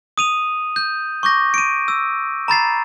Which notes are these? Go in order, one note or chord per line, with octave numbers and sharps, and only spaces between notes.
D#6 D#7 F7
G6
C#6 D6 G6 A#6
D7 D#7
E6
A#5 B5 A6 C7